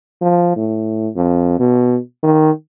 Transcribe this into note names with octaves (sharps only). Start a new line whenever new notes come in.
F3
A2
F2
B2
D#3